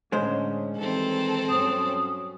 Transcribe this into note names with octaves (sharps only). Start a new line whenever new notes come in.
A2 D3 G#3 C#4 C5
D#3 E3 G3 C4 A4
G2 F#3 C#4 D#6